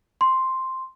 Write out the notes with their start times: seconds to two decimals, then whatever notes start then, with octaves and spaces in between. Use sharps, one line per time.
0.21 C6